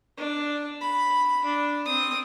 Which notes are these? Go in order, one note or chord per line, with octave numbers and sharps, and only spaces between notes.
D4
B5
D4
C4 D#6